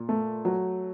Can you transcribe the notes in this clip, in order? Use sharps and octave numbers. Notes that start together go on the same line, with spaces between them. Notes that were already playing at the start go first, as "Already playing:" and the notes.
Already playing: A#2
A3
F#3